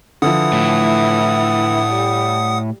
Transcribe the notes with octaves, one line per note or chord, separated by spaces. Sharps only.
D3 E3 F3 F#5 D#6
A2
G3